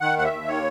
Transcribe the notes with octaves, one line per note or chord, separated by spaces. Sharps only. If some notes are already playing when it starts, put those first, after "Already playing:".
D#3 F#5
D#2 F#5
E5
D#2
D#3 C#5